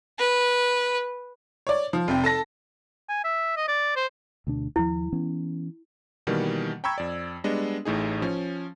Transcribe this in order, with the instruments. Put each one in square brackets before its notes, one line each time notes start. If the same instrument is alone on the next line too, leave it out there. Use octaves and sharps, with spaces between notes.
[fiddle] B4
[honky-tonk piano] C#5 D5
F3
F1 C3 G5
A4 A5 A#6
[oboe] G#5
E5
D#5
D5
C5
[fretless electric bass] D2 B2 D4
[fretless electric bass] D#2 F3 [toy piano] E4
[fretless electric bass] E3 B3 C#4
[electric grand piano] B2 D#3 E3 G3 A#3
G5 A#5 B5 C#6 E6 G#6
F2 D5
G3 G#3 B3 D4 D#5
A1 A2 D#4 G#4
F3 C#4